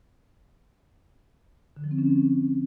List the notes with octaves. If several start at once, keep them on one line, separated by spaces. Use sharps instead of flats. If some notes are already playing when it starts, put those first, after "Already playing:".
D3
F3
C4
C#4